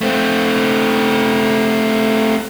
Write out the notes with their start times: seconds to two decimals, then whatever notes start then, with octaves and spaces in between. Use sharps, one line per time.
0.01 A3 C4